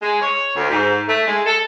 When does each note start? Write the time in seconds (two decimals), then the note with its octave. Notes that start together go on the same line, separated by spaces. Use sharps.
0.02 G#3
0.22 C#5
0.56 D2
0.70 G#2
1.08 A3
1.28 G#3
1.46 A4